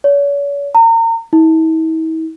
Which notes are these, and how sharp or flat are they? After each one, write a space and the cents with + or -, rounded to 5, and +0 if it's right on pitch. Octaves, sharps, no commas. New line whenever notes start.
C#5 +40
A#5 -35
E4 -45